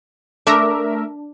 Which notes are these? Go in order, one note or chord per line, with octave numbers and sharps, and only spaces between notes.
A3 D4 A#4 E5